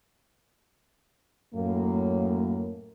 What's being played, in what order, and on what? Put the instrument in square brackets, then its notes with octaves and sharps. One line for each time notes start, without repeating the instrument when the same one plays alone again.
[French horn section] F#2 A2 A#3